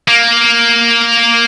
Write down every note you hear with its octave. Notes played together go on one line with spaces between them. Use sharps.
A#3